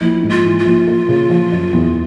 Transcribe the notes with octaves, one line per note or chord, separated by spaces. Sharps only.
A#1 E4
G#2
F4
E3
F4
A#1
A#3
C#3
F3
F#2
E2